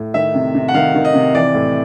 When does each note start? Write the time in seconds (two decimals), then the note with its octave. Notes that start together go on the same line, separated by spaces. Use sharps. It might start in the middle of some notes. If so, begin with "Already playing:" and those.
Already playing: A2
0.14 D#3 E5
0.34 C3
0.55 C3
0.68 F#5
0.74 D#3 F5
0.95 D#3
1.05 D#5
1.14 C3
1.34 E3 D5
1.54 A2